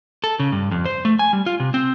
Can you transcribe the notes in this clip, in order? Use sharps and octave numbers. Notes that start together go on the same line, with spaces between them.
A4
C#3
G2
F2
C5
A3
G#5
G3
F4
C3
C4